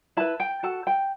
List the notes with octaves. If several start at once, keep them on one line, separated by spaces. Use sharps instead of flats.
E4 B4 A5
G5
F#4 A4 A5
G5